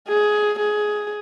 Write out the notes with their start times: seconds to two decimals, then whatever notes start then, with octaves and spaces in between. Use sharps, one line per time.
0.08 G#4
0.59 G#4